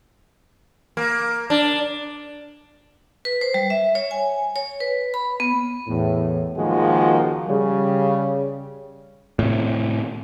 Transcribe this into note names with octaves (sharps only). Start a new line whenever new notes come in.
A#3
D4
B4
C5
G3
E5
C#5
G#5
C#5
B4
B5
B3
E2 A2
C#2 D#3 F3 G#3 A#3 F#4
C#3 G3
A2 C3